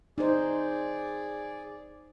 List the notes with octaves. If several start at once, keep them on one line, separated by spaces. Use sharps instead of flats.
D#4 G#4 C5 D5